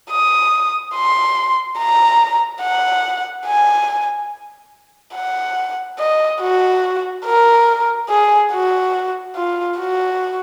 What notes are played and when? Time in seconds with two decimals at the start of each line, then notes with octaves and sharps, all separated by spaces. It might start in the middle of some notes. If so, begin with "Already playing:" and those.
0.10 D#6
0.95 C6
1.79 A#5
2.63 F#5
3.46 G#5
5.15 F#5
5.99 D#5
6.41 F#4
7.26 A#4
8.09 G#4
8.52 F#4
9.35 F4
9.78 F#4